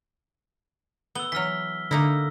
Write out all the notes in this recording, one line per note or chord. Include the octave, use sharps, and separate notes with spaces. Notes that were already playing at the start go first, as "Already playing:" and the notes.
B3 E6 G7
E3 F#3 F6 B6
D3 A#3 D#4 E4 E6 A#6